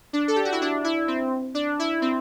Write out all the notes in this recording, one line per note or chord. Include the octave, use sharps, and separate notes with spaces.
D4
A4
G4
F#4
E4
D4
E4
C4
D4
E4
C4